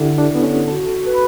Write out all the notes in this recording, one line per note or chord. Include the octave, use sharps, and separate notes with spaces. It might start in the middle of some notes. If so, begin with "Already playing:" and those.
Already playing: D3 D4 E4 G4 A4
D4
D3 B3
C#4
F#4 A4
B4